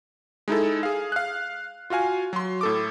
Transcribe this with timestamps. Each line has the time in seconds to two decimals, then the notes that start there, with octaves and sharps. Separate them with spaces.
0.48 G#3 D#4 E4 A4
0.83 G#4 F5
1.12 F5 F#6
1.90 F4 F#4 F5 G#5
2.33 F#3 C6
2.61 A2 A4 D6